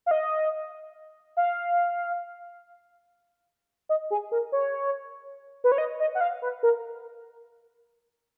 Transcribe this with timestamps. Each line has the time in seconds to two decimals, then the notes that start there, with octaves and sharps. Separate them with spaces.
0.06 F5
0.11 D#5
1.37 F5
3.89 D#5
4.11 G#4
4.32 A#4
4.52 C#5
5.64 B4
5.72 C#5
5.78 D#5
6.00 D#5
6.15 F#5
6.21 F5
6.42 B4
6.63 A#4